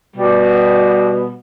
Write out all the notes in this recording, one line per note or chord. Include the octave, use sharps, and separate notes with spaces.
B2 G3 B3